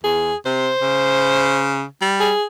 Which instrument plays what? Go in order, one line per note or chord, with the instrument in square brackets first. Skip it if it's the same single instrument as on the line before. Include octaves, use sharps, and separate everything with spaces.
[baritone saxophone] E2 [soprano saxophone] G#4
[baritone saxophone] C3 [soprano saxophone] C5
[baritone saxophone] C#3
G3
[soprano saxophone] G#4